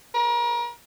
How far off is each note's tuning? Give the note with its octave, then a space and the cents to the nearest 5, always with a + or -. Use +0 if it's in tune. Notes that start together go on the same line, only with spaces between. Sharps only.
A#4 +35